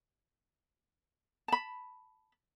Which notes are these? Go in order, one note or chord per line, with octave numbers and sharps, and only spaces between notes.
A5 B5